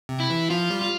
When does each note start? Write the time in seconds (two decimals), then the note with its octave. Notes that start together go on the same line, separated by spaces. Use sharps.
0.09 C3
0.20 E4
0.30 E3
0.50 F3 F4
0.70 G3
0.81 F4